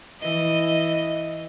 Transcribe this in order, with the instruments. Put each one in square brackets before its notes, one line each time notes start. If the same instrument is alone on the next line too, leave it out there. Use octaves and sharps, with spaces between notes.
[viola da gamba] E3 D#5